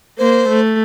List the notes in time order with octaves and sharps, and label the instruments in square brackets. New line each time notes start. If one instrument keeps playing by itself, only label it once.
[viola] A#3 [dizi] C5
[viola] A3